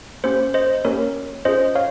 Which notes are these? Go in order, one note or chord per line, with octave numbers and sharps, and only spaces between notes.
A#3 C#4 G4 C5
C5 D#5
A#3 C#4 G4 A#4 C#5
C#4 F4 G#4 C5 D#5
C#5 F5